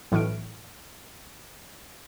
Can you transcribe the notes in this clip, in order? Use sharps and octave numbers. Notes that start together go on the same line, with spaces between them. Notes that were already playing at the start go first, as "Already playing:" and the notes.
B1 A2 E3 C#6 F6 D7